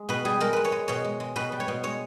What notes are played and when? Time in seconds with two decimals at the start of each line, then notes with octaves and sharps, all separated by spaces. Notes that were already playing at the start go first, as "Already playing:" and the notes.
Already playing: G#3
0.09 B2 B4
0.25 G3 G#4
0.40 G#3 A#4
0.53 G#3 B4
0.65 C#5
0.72 G#3
0.88 B2 C#5
1.04 G#3
1.20 G#3
1.36 B2 B4
1.52 G3
1.60 C#5
1.68 B2
1.83 G#3 C#5